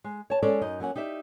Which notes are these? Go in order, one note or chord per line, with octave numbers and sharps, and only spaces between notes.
G#3
C#5 A5
G#3 C#4 A4 C#5 D5
F#2 D#4 D#5
F#3 A#3 C#4 F#5
D#4 G4 D5 E5